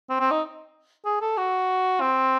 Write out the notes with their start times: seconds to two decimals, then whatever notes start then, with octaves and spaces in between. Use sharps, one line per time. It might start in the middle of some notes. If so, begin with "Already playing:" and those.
0.09 C4
0.20 C4
0.31 D#4
1.05 G#4
1.21 A4
1.37 F#4
2.01 C4